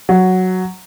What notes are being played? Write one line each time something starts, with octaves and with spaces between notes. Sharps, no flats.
F#3